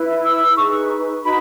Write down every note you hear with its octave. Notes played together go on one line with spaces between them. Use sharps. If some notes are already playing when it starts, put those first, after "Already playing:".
Already playing: E4 B4
E6
D#4 G#4 B4 C#6
D#4 F#4 B4 B5